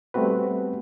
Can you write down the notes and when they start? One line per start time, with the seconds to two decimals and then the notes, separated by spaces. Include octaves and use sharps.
0.14 G3 A3 B3 C4 F#4 B4